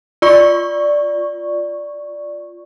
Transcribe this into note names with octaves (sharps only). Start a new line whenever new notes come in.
F4 D5 C#6